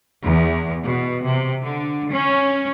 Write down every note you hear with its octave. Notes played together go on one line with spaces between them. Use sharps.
E2
B2
C3
D3
C#4